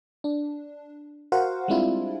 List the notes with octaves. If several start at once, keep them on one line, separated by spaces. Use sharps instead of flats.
D4
F#4 A#4 C5 F5 F#5
G3 G#3 C4 D4 E4 F4